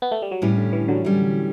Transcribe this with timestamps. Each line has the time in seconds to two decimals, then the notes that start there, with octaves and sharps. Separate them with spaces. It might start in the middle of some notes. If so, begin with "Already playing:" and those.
0.02 B3
0.12 A3
0.22 G3
0.31 F#3
0.42 A2 E3 G3 C#4
0.57 D3
0.72 E3
0.88 D3 F#3
1.05 A2 G3 C#4